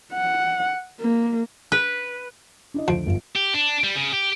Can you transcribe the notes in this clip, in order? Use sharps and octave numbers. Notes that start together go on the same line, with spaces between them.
F#5
A#3
B4
D4 E4 D#5
D2 F3 D7
G1 F4
G4
D4
G3
C#3
G4